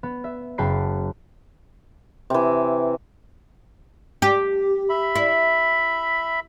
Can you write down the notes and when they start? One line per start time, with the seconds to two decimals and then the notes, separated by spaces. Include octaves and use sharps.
0.03 B3
0.24 E5
0.58 F#1 F#4 G5 A5 B5 C7
2.30 C3 E3
4.22 G4
4.89 E5 B5
5.15 E4